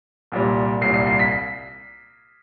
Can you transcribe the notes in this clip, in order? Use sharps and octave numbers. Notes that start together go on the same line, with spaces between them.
C2 A#2 G3
C2 A#2 G3 C7
C7
C7
B6